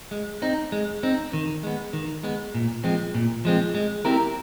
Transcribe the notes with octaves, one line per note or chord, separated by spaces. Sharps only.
G#3
C4 D#4
G#3
C4 D#4
D#3
G#3 B3
D#3
G#3 B3
A#2
F3 G#3 C4
A#2
F3 G#3 C4
G#3
C4 E4 G4 A#4